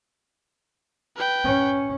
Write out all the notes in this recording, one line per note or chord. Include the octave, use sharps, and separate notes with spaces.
B4 G5
C#4